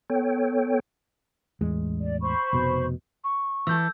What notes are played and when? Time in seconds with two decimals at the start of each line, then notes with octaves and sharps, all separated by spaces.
0.10 B3 A4 C#5 G5
1.61 A1 E2 G#3
2.00 D5
2.21 C5 B5 C#6
2.53 F1 B2
3.24 C#6
3.67 E3 A4 E6 G6